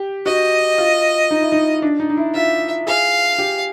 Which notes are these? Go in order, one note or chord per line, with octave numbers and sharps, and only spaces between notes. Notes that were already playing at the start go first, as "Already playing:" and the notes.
Already playing: G4
F#4 D#5
F4
D#4
E4
D#4
D4
D#4
D#4
E4
F4 E5
G#4 F5
G4